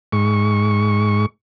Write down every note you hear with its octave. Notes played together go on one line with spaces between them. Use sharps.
G#2 C#6